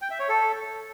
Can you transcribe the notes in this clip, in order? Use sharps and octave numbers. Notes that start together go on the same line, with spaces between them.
G5
E5
C#5
A4